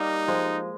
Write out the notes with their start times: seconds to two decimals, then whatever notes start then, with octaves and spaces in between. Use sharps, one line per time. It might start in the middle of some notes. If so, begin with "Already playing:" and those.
Already playing: G3 A#3 D#4
0.28 F3 G#3